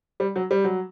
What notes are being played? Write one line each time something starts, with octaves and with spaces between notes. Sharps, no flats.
G3
F#3
G3
F#3